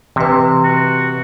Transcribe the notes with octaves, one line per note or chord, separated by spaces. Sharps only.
C3 E3 B4
F#4